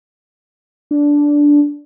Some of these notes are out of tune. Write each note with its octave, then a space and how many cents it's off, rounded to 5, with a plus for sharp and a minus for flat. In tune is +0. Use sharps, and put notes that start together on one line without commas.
D4 -10